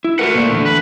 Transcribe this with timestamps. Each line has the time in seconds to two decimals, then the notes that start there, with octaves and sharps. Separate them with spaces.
0.04 E4
0.19 A3 F#4 A#4 B4 F#5
0.34 A#2 A#3 D5
0.50 E2 D3
0.65 B4